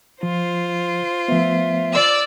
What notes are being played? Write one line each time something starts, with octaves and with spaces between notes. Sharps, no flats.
F3 F4 C5
F3 A3 B3 E5
D5 E6